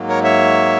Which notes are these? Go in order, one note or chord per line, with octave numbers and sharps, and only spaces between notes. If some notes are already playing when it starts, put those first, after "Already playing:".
Already playing: G#2 F#3 A#3
A#4 C#5
C#5 E5